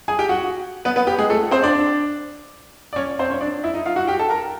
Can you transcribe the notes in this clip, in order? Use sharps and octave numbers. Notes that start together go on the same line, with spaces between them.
G#4 G#5
G4 G5
F#4 F#5
B3 B4
B3 B4
G4
G#3 G#4
A3 A4
C4 C5
D4 D5
D5
C#4 C#5
C4 C5
C#4 C#5
D4 D5
E4 E5
D#4 D#5
F4 F5
F#4 F#5
G4 G5
A4 A5
A#4 A#5